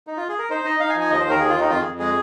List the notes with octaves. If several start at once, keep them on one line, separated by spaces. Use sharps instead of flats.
D#4
F4
G#4
A#4
D#4 C5
D#4 D#5
D#4 F5
G#5
F3
G#5
D#2 D#5
D#3 C5
A#4
D#2 G#4
F4
D#3 D#4
F2 F4
F2 G#4
G#3 G#4